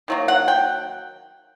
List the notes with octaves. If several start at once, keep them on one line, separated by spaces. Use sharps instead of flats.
D#3 F#3 A#3
F#5
G5